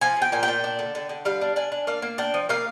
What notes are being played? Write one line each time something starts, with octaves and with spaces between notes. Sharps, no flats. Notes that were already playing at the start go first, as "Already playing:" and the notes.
F3 G#5
F3 G5
A#2 G#5
G5
A#2
D4
D3
D3
D3
G3 F5
D4
D4 G#5
D4
A#3 F5
A#3
D4 G5
F3
A#3 F5